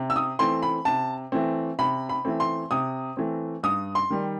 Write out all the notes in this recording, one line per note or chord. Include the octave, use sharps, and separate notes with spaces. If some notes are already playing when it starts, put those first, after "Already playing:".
Already playing: C3
E6
D#6
E3 A3 C4 C6
B5
C3 A5
E3 A3 C4
C3 B5
B5
E3 A3 C4
C6
C3 D#6
E3 A3 C4
G2 D#6
C6
D#3 G3